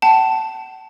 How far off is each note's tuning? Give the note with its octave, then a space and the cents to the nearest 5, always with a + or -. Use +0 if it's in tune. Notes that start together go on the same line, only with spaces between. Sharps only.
F#5 +45 A5 +0